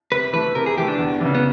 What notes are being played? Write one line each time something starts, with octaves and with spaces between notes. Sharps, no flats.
C3 B4
E3 A3 B4
C3 A#4
G#4
E3 A3 G4
D4
E2
C#3 E3
B3